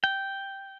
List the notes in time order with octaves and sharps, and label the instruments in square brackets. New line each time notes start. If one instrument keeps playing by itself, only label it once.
[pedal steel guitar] G5